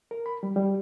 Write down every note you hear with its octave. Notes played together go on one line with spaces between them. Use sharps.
A#4
B5
G3
G3